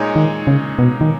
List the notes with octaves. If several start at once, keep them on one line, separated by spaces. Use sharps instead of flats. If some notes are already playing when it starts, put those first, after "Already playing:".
Already playing: A#2 G#3 D#4 G#4 C#5
D#3
C#3
B2
D#3